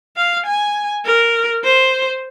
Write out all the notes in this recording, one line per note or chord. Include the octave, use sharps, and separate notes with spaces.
F5
G#5
A#4
C5